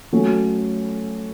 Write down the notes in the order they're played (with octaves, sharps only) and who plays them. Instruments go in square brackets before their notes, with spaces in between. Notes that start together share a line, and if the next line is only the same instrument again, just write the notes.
[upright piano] F#3 A3 C#4